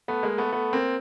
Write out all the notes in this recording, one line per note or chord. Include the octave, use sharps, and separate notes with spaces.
A3 B3
G#3 A#3
A3 B3
A3 B3
A#3 C4